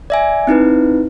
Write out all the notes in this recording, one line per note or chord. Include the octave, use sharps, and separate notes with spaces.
D5 E5 G#5
C4 D#4 E4 B4